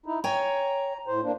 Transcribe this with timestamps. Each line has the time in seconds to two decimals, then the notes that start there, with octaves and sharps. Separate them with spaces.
0.06 D#4 E4
0.24 C#5 G5 G#5 A#5
1.07 A2 C5
1.24 A#3 D4